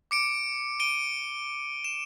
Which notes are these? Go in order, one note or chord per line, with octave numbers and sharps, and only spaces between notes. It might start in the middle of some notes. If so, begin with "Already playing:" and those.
D6 C#7 D7
D7 D#7 G7
E7